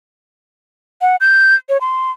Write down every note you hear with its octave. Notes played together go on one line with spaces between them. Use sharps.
F#5
G6
C#5
C6